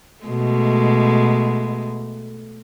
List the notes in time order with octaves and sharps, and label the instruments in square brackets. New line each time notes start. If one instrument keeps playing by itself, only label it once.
[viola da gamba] B2 G#3 A3